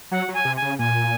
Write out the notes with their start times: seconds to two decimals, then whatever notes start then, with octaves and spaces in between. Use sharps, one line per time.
0.11 F#3 F#5
0.28 F#3 G#5
0.45 C3
0.56 G#5
0.62 C#3
0.78 A#2 G#5